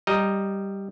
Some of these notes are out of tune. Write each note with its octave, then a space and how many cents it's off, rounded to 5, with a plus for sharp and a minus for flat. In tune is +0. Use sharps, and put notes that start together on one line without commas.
G3 +0 D#5 +0 A#5 +0